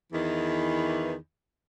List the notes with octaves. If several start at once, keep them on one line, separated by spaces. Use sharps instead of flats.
E2 D#3 E3